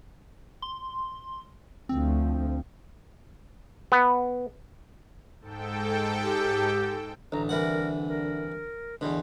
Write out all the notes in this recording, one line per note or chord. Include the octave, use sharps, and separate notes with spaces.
C6
D2 F3 C4
B3
G#2 A4 G5
G4
A1 D3 A#5
C2 E3 A#4 F#5
A#4
E2 B2 D3 C6